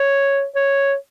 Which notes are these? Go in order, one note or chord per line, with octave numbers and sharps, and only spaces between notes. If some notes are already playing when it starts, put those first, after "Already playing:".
Already playing: C#5
C#5